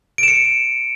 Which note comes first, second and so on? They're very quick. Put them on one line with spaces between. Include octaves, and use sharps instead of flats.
D7 E7 C#7